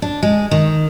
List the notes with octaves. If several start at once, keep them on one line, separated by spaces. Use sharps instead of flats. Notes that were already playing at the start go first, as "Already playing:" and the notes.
D4
G#3
D#3